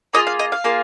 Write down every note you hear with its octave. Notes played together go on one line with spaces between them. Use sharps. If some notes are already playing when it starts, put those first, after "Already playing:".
A#3 F4 G#4 D#5
F5
D#5
F5
A#3 F4 G#4